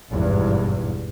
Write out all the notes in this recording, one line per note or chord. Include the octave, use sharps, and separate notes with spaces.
G#1 E2 G2 B2